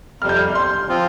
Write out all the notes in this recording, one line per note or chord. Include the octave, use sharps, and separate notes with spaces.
F2 C3 G3 F6
G6
F6
C6
F3 C4 F4